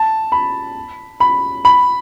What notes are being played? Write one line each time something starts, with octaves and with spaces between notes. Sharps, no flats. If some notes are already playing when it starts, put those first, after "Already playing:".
Already playing: A5
B5
B5
B5